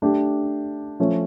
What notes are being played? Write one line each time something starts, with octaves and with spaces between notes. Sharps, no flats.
A3 D4 G4
F3 A3 C#4